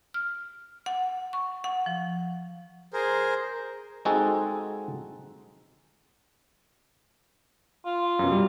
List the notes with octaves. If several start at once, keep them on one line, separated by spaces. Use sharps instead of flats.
F6
F#5
C#6
F#5
F3
G#4 A#4 C5
G#3 C4 D#4 F#4 G#4 A4
F4
F#2 B2
G3